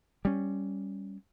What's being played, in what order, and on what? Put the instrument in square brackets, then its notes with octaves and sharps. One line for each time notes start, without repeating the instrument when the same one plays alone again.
[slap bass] G3 C#4